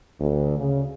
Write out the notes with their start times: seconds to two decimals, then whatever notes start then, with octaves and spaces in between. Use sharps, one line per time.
0.19 D2
0.57 C#3